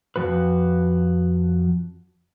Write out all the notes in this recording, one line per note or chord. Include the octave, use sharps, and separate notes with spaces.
F2 A2 F3 F#4 B4